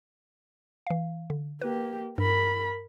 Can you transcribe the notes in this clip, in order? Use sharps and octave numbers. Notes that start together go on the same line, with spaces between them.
E3 F5
D3
A#3 G4 B4
G2 A#4 B5